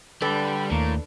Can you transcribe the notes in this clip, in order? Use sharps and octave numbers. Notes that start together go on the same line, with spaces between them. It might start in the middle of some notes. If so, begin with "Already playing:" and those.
D3 G3 D4 A4 B4 G5
D#2 A2 A#3